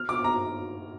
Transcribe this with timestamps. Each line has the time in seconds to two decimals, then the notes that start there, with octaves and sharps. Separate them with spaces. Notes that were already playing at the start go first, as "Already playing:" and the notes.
Already playing: F6
0.09 D6
0.24 A#5